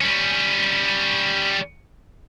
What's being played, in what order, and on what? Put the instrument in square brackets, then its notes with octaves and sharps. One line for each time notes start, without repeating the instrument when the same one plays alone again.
[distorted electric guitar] G3 C#4